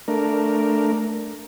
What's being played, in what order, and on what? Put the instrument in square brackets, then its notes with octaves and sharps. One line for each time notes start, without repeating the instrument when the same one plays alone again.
[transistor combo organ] A3 D4 A#4